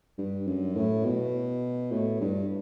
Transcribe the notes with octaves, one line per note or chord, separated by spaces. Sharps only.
G2
F#2
A2
B2
A2
G2